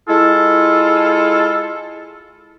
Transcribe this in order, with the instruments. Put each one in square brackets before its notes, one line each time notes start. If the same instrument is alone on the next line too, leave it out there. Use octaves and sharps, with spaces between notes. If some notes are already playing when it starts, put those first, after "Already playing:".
[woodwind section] G#3 E4 F4 A4